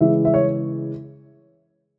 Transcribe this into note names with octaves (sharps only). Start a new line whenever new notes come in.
C#3 E3 G#3 E5
E5
C#5